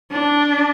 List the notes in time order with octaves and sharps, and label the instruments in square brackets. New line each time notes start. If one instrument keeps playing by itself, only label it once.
[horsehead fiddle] D4